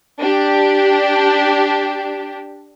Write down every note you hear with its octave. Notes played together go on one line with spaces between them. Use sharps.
D4 G4